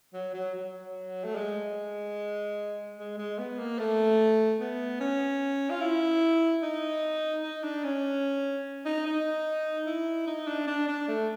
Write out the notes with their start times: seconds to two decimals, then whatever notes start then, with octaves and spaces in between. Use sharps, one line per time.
0.14 F#3
0.34 F#3
0.54 F#3
1.24 A3
1.35 G#3
2.98 G#3
3.18 G#3
3.38 B3
3.59 A#3
3.79 A3
4.60 B3
5.00 C#4
5.70 F4
5.81 E4
6.63 D#4
7.43 D#4
7.64 D4
7.84 C#4
8.85 D#4
9.06 D#4
9.86 E4
10.27 D#4
10.47 D4
10.67 D4
10.88 D4
11.08 A3